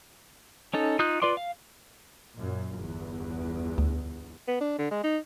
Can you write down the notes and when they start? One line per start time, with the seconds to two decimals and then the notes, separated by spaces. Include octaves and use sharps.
0.74 C#4 D#4 A4
0.99 D#4 F4 D#6 F#6 G6
1.22 F4 B4 D5 C6 D6
1.37 F5
2.35 F#2 A#2
2.77 G1 E2
3.78 D2
4.48 B3
4.61 D4
4.78 D3
4.91 G#3
5.04 D#4